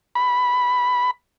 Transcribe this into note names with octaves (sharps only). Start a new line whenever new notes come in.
B5